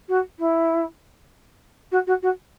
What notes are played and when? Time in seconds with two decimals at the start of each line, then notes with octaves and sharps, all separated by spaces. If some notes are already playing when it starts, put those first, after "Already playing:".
0.08 F#4
0.39 E4
1.91 F#4
2.07 F#4
2.22 F#4